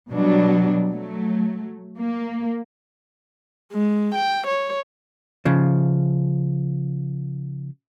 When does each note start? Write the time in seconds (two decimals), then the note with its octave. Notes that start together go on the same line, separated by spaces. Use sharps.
0.11 B2 F#3 G3 D4
0.89 F#3 A3
1.99 A#3
3.72 G#3
4.15 G5
4.47 C#5
5.45 C#3 F3